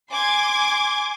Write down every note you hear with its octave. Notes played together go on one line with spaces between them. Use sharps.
G#5 C6 D6 G#6